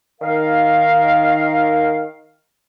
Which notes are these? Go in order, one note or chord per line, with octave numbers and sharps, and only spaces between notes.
D#3 A#4 F5